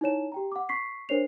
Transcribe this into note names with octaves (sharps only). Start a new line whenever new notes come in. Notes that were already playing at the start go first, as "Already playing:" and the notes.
D#4 E4 C#5 E7
G4 G5 A#5
F#5 D6
C#6 B6 C7
D4 A#4 C5 C#5 C7 F7